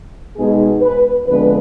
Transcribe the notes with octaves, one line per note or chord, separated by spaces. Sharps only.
B2 G#3 B3 D#4 G#4
B4
F2 D3 G#3 B3 B4